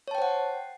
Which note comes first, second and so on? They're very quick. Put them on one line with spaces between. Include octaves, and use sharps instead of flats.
C#5 A5 G5 C5 F#5